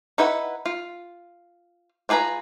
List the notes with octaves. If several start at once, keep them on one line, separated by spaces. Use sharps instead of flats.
D#4 E4 B4 F#5
F4
D4 F4 G#4 B4 A#5